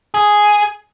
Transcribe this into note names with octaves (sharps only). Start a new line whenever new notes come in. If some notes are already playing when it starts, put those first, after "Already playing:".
G#4